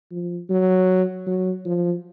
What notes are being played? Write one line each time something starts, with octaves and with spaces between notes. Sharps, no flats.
F3
F#3
F#3
F3